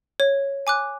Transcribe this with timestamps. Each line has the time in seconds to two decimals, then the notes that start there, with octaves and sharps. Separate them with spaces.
0.20 C#5
0.67 G#5 D6 F#6